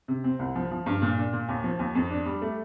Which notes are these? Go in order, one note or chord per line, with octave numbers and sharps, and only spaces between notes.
C3
C4
C2
F3
F3
G2
A#2
D4
A#2
D#2
F3
D#2
F2
D4
G3
A3